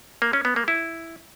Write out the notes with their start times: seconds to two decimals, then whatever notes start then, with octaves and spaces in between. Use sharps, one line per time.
0.22 A#3
0.33 C#4
0.45 B3
0.56 A#3
0.68 E4